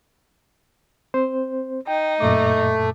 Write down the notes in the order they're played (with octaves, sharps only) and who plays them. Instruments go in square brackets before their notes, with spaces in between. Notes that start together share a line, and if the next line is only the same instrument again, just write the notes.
[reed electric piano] C4 C5
[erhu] D#4 [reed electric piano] G5
[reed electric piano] F#2 A#2 D6 [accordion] A3